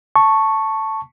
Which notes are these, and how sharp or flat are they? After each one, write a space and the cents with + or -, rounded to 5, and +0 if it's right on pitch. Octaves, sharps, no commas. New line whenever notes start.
A5 +5 C#6 -5